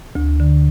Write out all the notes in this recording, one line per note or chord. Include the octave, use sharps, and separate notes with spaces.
D2
D3